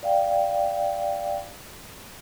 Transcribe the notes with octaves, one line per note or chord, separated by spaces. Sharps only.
D5 F5 G5